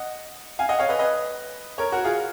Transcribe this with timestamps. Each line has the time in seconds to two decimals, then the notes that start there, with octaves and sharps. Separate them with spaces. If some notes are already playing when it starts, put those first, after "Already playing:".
Already playing: D#5 F#5
0.59 F5 G#5
0.69 D#5 F#5
0.79 C#5 F5
0.89 B4 D#5
0.99 B4 D#5
1.78 A#4 C#5
1.92 F#4 A#4
2.05 F4 G#4